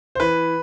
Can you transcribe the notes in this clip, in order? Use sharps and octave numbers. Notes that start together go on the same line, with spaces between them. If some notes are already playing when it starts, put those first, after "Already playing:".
C5
E3 B4